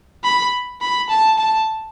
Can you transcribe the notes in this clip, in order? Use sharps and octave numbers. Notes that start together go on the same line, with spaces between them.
B5
B5
A5
A5